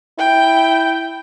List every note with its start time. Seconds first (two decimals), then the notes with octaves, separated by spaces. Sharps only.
0.19 E4 G5